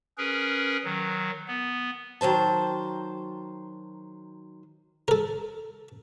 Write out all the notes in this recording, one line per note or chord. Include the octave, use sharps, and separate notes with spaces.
C#4 G#4 A#4 B4
D#3 F#3
B3
D#3 F#3 C5 A5
A4 A#4